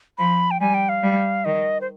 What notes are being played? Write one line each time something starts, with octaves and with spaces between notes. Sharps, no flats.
F3 B5
G5
G3 G#5
G5
F5
G3
D#3 D#5
C5